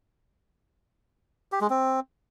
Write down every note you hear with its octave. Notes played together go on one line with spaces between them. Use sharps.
G4
G#3
C4